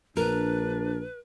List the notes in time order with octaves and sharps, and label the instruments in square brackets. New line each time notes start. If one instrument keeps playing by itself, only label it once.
[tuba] A#1 [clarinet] D4 [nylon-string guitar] A#4 [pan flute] B4